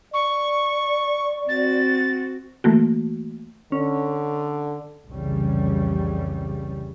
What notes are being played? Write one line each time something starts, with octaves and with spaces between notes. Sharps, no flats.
D5 C#6
C4 F#4 A6
E3 A3 A#3 F#4
D3 C#4
F1 C2 C#3 E3 G3 C#4